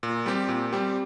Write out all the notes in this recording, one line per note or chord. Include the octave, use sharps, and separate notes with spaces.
A#2
G3 C4 G4
A#2
G3 C4 G4